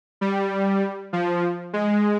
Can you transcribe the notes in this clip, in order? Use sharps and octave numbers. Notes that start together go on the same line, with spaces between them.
G3
F3
G#3